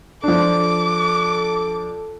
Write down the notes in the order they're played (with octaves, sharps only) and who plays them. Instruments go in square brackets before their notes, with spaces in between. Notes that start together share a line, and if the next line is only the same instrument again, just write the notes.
[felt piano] F3 D4 [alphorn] A4 [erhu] D6